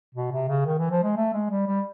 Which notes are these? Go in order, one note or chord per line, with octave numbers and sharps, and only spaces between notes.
B2
C3
C#3
D#3
E3
F3
G#3
A3
G#3
G3
G3